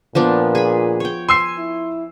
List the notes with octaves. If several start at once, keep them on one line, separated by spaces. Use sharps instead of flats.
A#2 F3 B3 D4
G#4 B5
C#5 G5
G#5 C6 E6 C7
E4